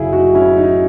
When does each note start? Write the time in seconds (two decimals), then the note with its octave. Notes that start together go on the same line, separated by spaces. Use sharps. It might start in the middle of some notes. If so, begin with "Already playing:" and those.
Already playing: F#1 F#2 C#3 F#3 E4 G#4
0.12 D#4 F#4
0.35 C#4 E4
0.57 D#4